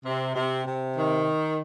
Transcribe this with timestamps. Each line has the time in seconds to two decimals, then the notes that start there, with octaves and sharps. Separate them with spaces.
0.05 C3
0.35 C3
0.65 C3
0.96 D#3